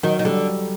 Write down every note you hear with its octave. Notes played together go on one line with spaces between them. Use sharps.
D#3 F#3
D#3
D3 G3